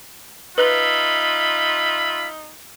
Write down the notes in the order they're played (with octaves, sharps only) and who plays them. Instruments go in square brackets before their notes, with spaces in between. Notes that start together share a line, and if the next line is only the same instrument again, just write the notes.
[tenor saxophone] D#4 [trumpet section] F4 E5 B5 [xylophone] B4 F#6 F#7